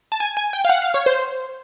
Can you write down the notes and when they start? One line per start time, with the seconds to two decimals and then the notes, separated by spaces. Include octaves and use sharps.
0.12 A5
0.20 G#5
0.37 G#5
0.53 G5
0.65 F5
0.69 F#5
0.82 F5
0.94 C#5
1.06 C5